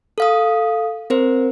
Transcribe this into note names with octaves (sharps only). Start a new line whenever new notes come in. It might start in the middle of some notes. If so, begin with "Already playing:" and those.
A4 F5 D#6
C4 A#4 C5